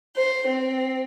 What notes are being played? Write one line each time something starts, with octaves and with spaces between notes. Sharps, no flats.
C5
C4